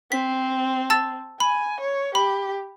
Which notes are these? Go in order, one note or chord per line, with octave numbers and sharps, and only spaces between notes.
C4 B6
A5 E6 A6
G#5 B5
C#5
G4 B5